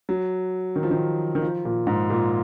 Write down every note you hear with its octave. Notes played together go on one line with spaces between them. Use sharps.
F#3
D#3
F3
D#3
D#3
F3
A#2
G#2
A#2